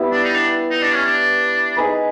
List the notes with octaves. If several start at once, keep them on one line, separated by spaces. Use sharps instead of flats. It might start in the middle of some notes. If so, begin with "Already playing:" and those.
Already playing: G3 B3 E4
D4
D#4
D4
D#4
D4
C#4
D4
D#4 G#4 B4